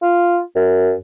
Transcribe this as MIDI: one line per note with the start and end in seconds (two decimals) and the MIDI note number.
0.02 0.40 65
0.55 0.94 42